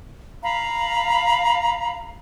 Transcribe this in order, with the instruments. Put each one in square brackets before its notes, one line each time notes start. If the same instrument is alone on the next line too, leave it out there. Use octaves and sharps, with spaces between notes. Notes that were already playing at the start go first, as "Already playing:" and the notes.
[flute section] F5 A#5 B5